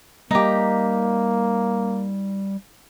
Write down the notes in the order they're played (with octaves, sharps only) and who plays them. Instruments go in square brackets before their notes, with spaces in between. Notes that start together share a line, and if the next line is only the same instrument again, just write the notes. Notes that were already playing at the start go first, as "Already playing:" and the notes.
[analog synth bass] G3 [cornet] A#3 [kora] D#4 G4